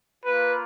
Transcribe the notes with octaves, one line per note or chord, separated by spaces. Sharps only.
A#3 F4 B4